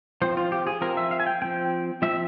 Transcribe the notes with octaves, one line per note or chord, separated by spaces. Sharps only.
F3 C4 C5
F4
G4
G#4
F3 C4 A#4
E5
F5
G#5
G5
F3 C4 G5
F3 C4 E5